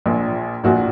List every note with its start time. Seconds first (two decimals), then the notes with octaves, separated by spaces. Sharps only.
0.06 A#1 A#2
0.64 A#1 A#2 F#4